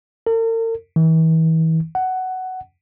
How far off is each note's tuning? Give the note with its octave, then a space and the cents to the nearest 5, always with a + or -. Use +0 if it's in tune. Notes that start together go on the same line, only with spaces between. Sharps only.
A#4 -45
E3 -40
F#5 +10